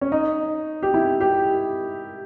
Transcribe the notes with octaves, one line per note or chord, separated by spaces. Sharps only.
C#4
D#4
G4
E4
G4